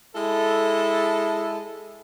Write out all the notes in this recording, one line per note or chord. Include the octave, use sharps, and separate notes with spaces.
G#3 E4 A4